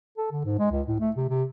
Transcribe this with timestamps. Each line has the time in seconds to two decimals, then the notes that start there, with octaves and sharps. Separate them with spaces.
0.18 A4
0.32 D3
0.45 G#2
0.59 G#3
0.71 C#2
0.88 A2
1.00 A3
1.16 C3
1.29 C3